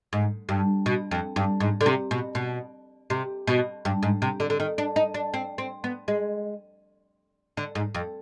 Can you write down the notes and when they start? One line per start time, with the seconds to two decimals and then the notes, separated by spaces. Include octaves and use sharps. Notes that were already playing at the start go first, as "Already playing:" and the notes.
0.13 G#2
0.49 G2
0.86 B2
1.11 F2
1.36 G2
1.60 G#2
1.81 D3
1.86 C3
2.11 B2
2.35 B2
3.10 C3
3.47 B2
3.85 G2
4.03 G#2
4.22 C3
4.40 D3
4.50 D3
4.60 D#3
4.78 D4
4.96 D#4
5.14 D4
5.34 C4
5.58 C4
5.84 B3
6.08 G#3
7.57 D3
7.75 G#2
7.95 F2